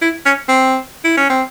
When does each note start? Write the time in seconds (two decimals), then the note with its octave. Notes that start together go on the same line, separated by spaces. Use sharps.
0.02 E4
0.26 C#4
0.49 C4
1.04 E4
1.17 C#4
1.30 C4